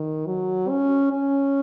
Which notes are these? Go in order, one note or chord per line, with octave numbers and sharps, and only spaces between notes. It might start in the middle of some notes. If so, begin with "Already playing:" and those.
Already playing: D#3
F#3
C#4
C#4